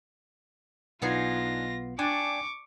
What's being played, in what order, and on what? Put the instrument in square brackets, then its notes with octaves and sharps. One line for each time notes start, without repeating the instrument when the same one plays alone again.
[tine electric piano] B1 B3 C7 [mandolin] D4 D#4 G#5 [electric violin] F4 A#6
[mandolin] D4 [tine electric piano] D5 G5 G#5 [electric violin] C#6 D6